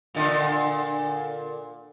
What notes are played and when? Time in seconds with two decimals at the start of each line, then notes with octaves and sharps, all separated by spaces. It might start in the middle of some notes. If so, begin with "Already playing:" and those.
0.15 A#2 D3